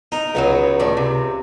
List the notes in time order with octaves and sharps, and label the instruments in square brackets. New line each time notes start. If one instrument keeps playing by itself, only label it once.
[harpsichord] D#4 [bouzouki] A#4
[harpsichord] C#2 [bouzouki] F#3 B3 D#4
[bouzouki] A2 D#3 D5
C3